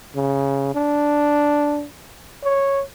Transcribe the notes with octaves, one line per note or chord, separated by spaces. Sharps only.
C#3
D4
C#5